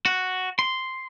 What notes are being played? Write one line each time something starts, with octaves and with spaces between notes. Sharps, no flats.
F#4
C6